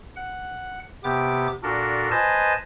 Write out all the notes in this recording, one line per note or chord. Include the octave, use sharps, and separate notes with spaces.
F#5
C3 B3 G4 D6
A#2 D4 F#4 A4 A#4
B4 C5 D#5 G#5 A5